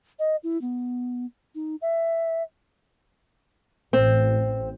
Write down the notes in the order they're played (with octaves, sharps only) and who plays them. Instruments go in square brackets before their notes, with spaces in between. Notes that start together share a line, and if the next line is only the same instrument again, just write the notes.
[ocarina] D#5
E4
B3
D#4
E5
[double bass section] A1 [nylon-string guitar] C4